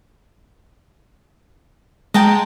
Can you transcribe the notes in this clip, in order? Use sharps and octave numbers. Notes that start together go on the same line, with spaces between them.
G#3 G5 A5 A#5